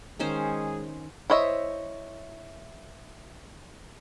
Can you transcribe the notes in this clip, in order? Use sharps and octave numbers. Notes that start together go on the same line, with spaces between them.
D#3 G#3 C#4 G#4 C5
E4 C5 C#5 D#5 E5